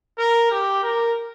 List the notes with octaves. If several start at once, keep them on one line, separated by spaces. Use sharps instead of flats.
A#4
G4
A#4